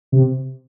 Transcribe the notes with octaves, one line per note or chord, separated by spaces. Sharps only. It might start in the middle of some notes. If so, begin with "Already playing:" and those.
C3